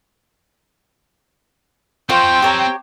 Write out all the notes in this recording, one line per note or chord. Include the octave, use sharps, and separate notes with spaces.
C4 F4 A4 C5 G5 C#6
G4 C#5 A#5